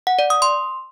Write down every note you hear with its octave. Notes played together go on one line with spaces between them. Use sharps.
F#5
D5
D#6
C6